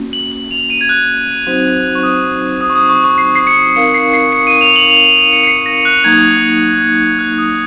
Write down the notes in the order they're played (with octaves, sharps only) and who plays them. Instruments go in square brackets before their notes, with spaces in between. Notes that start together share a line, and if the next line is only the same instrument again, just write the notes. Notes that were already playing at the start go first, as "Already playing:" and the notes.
Already playing: [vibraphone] A#3 C#4 F#4
[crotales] F#7
F#7
F7
D#7
G#6
F#6
[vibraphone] F#3 C4 D#4 F#4 C5
[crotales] C#6
D#6
D#6
C#6
D#6
C#6
C#6
C7
C7
C#7
[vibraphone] C4 D#4 A#4 F5 [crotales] C#7
[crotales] C7
C7
C#7
D#7
F7
F#7
F7
F7
D#7
C#7
C#7
C7
A#6
F#6
[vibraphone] F#3 A#3 D#4 [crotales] G#6
[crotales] F#6
D#6